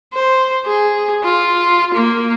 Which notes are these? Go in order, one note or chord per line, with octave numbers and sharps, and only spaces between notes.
C5
G#4
F4
A#3